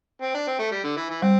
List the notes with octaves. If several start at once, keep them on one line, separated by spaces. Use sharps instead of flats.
C4
D4
C4
A3
G3
D3
E3
E3
G3 C4